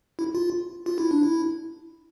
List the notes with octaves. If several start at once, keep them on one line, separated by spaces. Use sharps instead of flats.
E4
F4
F4
E4
D4
E4